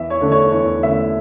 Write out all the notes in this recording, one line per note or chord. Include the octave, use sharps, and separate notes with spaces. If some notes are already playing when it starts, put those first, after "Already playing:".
Already playing: E2 E5
C#5
D3 A3 C#4
C#5
E2 C#5
D3 A3 C#4 E5